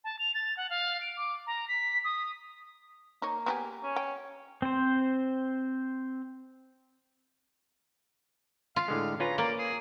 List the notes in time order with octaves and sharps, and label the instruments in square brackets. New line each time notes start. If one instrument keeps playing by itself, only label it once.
[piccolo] A5
F7
A6
F#5
F5
D7
D6
A#5
B6
D#6
[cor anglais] A#3 [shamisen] D#4 C#5
[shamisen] B3 G4 G#4
[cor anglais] C#4
[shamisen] G5
[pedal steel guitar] C4 C5
[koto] F4 [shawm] F5
[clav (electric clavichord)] A2 D3 G#3
[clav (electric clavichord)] C#4 F4 B4 [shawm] A#5
[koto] A#3 [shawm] D5
[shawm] G#4